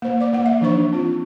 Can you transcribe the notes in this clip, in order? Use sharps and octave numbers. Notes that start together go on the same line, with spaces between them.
A#3 C5
D5 D6
A#3 F#5
E5
E3 F3 D4 D#4 C5 C#6
C4 F4